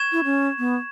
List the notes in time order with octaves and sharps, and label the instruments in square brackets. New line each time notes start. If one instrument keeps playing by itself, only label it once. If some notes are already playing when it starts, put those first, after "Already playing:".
Already playing: [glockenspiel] C#6 G#6 E7
[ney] E4
C#4
B3